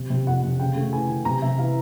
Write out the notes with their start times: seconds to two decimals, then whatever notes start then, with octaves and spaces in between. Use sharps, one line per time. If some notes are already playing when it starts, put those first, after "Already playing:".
Already playing: C3
0.10 C3
0.27 F2 F#5
0.43 C3
0.59 C#3 G5
0.76 A3
0.93 E3 G#5
1.09 C#3
1.25 C3 A#5
1.42 C3 E5
1.59 E3 F5